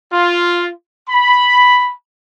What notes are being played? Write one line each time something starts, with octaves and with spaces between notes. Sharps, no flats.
F4
B5